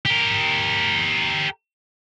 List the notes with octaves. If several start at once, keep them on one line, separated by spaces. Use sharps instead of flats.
G4 A#4